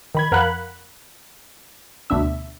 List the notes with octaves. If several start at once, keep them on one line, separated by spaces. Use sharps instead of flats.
D#3 B5 G#6
F2 A#4 F5 F#5 B5 F#6
D2 B2 D4 E5